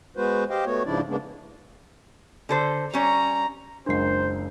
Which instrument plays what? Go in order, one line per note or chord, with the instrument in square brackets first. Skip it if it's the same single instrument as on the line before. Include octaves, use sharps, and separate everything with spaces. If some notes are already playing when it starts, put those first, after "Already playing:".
[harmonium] G#3 B3 F#4 B4 C5
G4 C5 D#5 F5 G5
A3 B3 F#4 C#5
G#2 C#3 F3 D4 E4 D5
C#3 G#3 A#3 B3 D4
[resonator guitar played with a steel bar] D3 A4 C5
[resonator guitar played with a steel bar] G3 C#4 [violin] A#5
[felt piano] F#1 C#2 A#4 [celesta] D4 C7 [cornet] C5